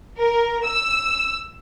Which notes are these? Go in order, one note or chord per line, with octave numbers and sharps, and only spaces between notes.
A#4
E6